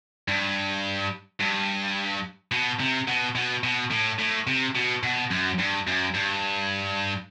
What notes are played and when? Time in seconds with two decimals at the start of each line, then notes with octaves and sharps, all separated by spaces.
0.28 G2
1.40 G2
2.51 B2
2.80 C3
3.07 B2
3.35 B2
3.63 B2
3.91 A2
4.19 A2
4.47 C3
4.75 B2
5.03 B2
5.31 F#2
5.59 G2
5.87 F#2
6.14 G2